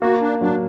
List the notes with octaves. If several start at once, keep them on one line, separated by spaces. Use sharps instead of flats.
A#3 F#4
D4
F#3 D4